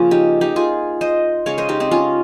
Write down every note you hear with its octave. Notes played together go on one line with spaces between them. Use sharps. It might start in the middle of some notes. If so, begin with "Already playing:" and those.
Already playing: C#3 F3 A#3 C#4 F4
D#4 G4
D#4 G4
F4 G#4
C5 D#5
C#3 G#3 C#5 F5
C5 D#5
D#4 G4
C4 D#4
C#4 F4